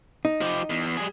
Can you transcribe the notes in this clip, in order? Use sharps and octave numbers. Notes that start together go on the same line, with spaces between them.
D#4
F3 G4
E2
G3 G#4